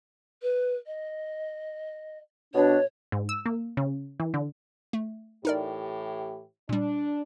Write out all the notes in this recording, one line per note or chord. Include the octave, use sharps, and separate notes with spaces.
B4
D#5
B2 D4 C#5
G#2
E6
A#3
C#3
E3
D3
A3
A2 E3 D#4 G4 A#4 D5
A#2 G3 D4